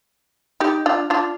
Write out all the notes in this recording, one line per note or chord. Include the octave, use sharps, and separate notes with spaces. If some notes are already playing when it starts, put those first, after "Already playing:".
D#4 G4
D4 F4
D4 F4